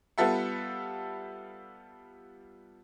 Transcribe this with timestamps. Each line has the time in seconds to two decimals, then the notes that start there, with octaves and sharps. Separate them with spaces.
0.18 G3 B3 F4 A4 E5 F#5